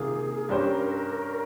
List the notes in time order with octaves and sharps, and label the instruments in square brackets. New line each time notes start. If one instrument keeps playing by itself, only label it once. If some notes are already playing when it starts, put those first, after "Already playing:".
Already playing: [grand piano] C3 D#3 A#3 F4 [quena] G#4
[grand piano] G2 G3 C#4 G4 C5 [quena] A#4